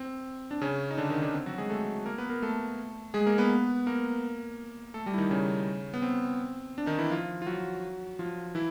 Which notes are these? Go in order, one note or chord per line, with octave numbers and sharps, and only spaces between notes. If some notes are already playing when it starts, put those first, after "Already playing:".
Already playing: C4
D4
C#3 C#4
D#4
D3 D4
D#3 D#4
D3 D4
C4
F#3 F#4
G#3 G#4
A3 A4
A#3 A#4
B3 B4
A#3 A#4
A3 A4
G#3 G#4
A#3 A#4
B3 B4
A#3 A#4
A3 A4
G3 G4
E4
D#3 D#4
C#3 C#4
B3
C4
D4
D#3 D#4
E3 E4
F3 F4
F4
F#3 F#4
F3 F4
E3 E4